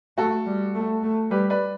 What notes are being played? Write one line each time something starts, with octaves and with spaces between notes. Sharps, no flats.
A3 F#4 A4
G3
A3
A3
G3 G4 B4
B4 D5